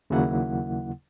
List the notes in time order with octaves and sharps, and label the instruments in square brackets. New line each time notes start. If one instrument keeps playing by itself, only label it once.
[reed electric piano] D#2 C#3 F#3 A#3 E4 F#5